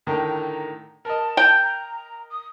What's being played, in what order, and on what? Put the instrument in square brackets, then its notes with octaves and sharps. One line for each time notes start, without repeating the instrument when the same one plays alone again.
[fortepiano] A2 D3 D#3 [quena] A#5
[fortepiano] A#4 D#5 [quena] A5
[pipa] G5
[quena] A#5
D#6